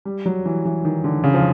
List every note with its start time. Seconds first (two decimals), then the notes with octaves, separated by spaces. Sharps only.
0.05 G3
0.26 F#3
0.46 E3
0.65 E3
0.85 D#3
1.04 D3
1.24 C#3
1.34 F3